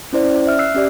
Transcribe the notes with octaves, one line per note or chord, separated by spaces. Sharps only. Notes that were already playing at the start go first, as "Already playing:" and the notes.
C#4 E4 C5 D5
C#4 D5
E5 F6
E6 F#6 C7
C#4 G4 D5